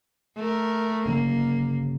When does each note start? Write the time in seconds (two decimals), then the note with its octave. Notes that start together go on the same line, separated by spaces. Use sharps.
0.36 A3 A#4
1.05 G1 C#3 F#3 A#3